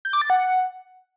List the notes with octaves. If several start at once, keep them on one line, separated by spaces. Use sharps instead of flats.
G6
D6
A6
F#5